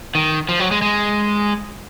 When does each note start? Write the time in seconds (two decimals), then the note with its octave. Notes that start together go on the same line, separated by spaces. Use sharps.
0.15 D#3
0.49 F3
0.60 F#3
0.71 G#3
0.82 G#3